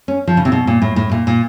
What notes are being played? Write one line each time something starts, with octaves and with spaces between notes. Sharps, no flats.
C#4
F3
C#3
C3
B2
A#2
A2
A2
A#2
A#2